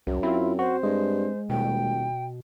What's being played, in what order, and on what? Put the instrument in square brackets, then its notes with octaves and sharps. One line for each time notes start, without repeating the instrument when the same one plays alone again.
[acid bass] C2 [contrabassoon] F#2
[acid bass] C4 [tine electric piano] E4 F4
[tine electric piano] F#4 [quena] C5
[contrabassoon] G2 [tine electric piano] G#3
[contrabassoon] D#1 [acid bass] B2 [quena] G5